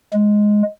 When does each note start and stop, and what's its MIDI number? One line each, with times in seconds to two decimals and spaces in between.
0.13 0.62 56